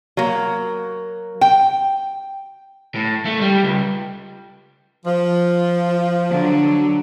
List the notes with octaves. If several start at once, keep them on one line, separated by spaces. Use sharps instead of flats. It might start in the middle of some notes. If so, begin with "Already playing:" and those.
F#3 A#3
G5
A2
A3
G3
C#2
F3
D3 F#3